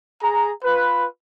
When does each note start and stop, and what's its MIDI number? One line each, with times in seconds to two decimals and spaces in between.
0.22 0.51 68
0.22 0.51 82
0.64 1.05 65
0.64 1.05 71